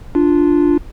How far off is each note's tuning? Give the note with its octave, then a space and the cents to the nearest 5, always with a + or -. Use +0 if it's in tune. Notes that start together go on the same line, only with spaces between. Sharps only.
D4 +0 F4 -5